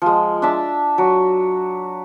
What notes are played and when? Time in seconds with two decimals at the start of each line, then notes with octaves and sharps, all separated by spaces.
0.02 F3 G#3
0.42 D4 E5 A5
0.98 F#3